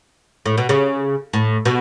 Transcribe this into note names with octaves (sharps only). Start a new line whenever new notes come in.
A2
B2
C#3
A2
B2